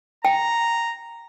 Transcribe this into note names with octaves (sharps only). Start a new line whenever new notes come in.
G5 A#5